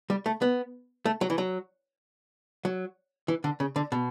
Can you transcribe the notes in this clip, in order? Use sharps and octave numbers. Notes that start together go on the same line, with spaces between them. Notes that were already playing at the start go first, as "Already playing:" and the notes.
G3
A3
B3
A3
F#3
E3
F#3
F#3
E3
D3
C#3
D3
B2